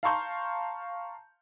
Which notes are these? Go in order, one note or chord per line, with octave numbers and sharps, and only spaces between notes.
F5 A5 A#5 C6 C#6 G6